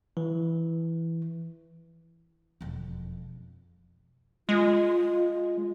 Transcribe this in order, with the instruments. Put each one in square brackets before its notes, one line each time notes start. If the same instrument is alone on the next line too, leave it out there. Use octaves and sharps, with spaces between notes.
[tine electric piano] E3
[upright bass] E1 F2
[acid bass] G#3 [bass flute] F4